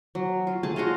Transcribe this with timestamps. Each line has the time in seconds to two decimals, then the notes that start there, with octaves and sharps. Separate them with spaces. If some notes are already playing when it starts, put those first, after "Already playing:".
0.15 F#3
0.47 F4
0.63 A3 G#4 A5
0.76 F4 F#4 D#5 F5